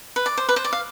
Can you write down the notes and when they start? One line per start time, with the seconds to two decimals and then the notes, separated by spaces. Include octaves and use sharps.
0.16 B4
0.26 D5
0.37 C5
0.49 B4
0.56 C5
0.64 D5
0.73 F5